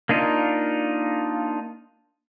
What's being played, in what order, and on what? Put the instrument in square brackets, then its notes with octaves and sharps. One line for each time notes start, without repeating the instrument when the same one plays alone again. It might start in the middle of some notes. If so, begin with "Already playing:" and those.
[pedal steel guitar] A#3 D4 D#4 F4